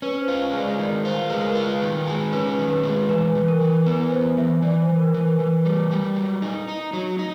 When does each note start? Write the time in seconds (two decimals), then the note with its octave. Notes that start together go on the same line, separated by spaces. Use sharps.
0.02 C#4 B4
0.22 C5
0.28 F4
0.53 G#3
0.59 D5
0.78 D#3 D5
1.05 F4 C5
1.30 G#3 B4
1.42 A#4
1.52 F4 B4
1.82 D#3
2.07 G#3
2.33 C#4 B4
2.58 D#3
2.70 B4
2.83 G#3
3.09 E3 B4
3.35 E3
3.48 A#4
3.60 E3
3.86 B3 B4
4.11 E3 C5
4.38 E3 E5
4.62 E3 D5
4.82 C5
4.89 E3
4.96 A#4
5.01 B4
5.14 E3
5.21 A#4
5.39 E3 B4
5.65 G3
5.91 G3
6.16 F#3
6.42 D#4
6.68 D#4
6.93 F#3
7.19 D#4